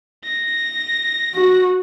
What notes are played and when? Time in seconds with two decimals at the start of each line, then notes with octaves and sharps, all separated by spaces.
0.24 A#6
1.35 F#4